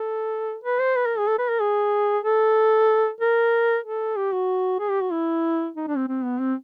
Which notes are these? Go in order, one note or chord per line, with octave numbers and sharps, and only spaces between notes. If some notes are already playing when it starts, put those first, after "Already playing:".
Already playing: A4
B4
C5
B4
A#4
G#4
A4
B4
A#4
G#4
A4
A#4
A4
G4
F#4
G#4
G4
F#4
E4
D#4
D4
C4
C4
B3
C4